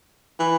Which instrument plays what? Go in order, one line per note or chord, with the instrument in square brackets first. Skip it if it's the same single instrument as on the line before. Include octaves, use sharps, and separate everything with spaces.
[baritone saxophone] E3